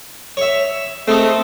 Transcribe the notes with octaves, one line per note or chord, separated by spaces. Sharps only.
C#5 E5
A3 C4 D#4 A4